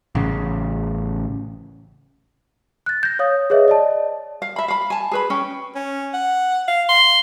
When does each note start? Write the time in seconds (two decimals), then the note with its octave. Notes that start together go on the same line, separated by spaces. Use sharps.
0.15 A1 C#3
2.86 F#6 A6
3.03 G6 A#6
3.19 C#5 F5 D#6
3.50 G#4 B4 C#5 D#5 E5
3.68 D5 D#5 A5
4.42 F5
4.56 E5 B5
4.68 F5 B5
4.90 G#5 A5
5.11 G#4 B4 B5
5.30 C#4 G5
5.75 C#4
6.14 F#5
6.68 F5
6.89 C6